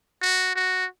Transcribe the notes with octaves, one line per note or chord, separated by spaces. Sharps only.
F#4
F#4